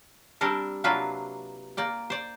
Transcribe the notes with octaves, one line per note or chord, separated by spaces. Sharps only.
G3 C4 D4 A4 A#4
C3 F#3 A#3 D4 F4 B4
A#3 D5 G5
C5 D5